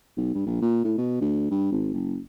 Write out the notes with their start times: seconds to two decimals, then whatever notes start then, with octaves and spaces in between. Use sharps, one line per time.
0.17 B1
0.35 G2
0.46 A#1
0.62 A#2
0.85 A2
0.98 B2
1.21 D2
1.51 G2
1.72 G#1
1.94 F#1